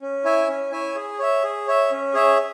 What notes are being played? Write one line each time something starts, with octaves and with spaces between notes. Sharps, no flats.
C#4
E4 C#5 E5 G#5
C#4
E4 C#5 E5 G#5
G#4
C#5 E5
G#4
C#5 E5
C#4
G#4 C#5 E5